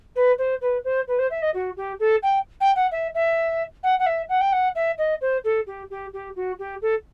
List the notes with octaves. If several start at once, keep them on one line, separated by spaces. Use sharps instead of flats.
B4
C5
B4
C5
B4
C5
E5
D#5
F#4
G4
A4
G5
G5
F#5
E5
E5
F#5
F#5
E5
F#5
G5
F#5
E5
D#5
C5
A4
G4
G4
G4
F#4
G4
A4